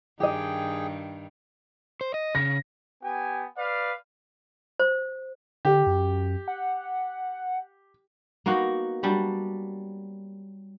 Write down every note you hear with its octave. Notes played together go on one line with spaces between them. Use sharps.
G2 D#3 G4 G#4 D#5 G5
C5
D#5
C#3 A#6
B3 G4 G#5
B4 D5 F5
C5
D3 G4
F#2
F#5
A#3 B3 D#4 F#4
F#3 G3 D4 G4